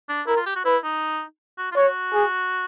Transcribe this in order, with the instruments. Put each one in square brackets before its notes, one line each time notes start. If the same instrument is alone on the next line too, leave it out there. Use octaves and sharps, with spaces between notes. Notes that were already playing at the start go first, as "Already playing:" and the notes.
[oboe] D4
[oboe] E4 [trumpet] A#4
[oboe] F4
G4
F#4
[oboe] E4 [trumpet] B4
[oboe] D#4
F#4
F4
[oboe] F#4 [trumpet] C#5
[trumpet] G#4